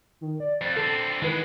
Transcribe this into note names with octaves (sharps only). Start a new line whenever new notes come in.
D#3
D5
F2 A6
D3 C4 A4
D#3 E3 G#3 B3 B4